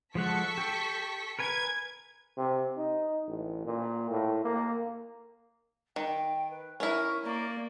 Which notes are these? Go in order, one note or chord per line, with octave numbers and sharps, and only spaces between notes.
F3 G#3 A4 F#5 C#6 B6
G4
A#4 B4 G#5 G#6
C3
D#4
A1
A#2
A2
A#3
D#3 G5
B4
C#4 E4 A#4 C#6
A#3 D5